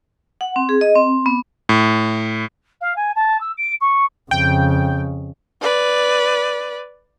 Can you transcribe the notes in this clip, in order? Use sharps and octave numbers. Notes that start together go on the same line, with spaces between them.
F#5
C4
G#4
D#5
C4
B3
A2
F5
G#5
A5
E6
D7
C#6
F2 C#3 G5
B4 D5